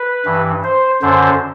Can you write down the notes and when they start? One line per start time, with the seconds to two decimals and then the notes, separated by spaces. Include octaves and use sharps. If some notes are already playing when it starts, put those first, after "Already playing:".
Already playing: B4
0.25 G2 E3
0.64 C5
1.02 F#2 D3 C5